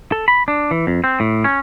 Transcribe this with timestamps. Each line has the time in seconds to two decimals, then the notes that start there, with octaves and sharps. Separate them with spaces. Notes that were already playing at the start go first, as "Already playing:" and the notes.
0.12 A4
0.28 B5
0.48 D4
0.71 E3
0.87 F2
1.04 C4
1.20 A2
1.44 C#4